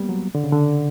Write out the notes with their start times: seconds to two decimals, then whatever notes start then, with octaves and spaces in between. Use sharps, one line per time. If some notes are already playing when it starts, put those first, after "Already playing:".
Already playing: G3 A#3 B3
0.09 F#3
0.35 D3
0.44 C#3
0.52 D3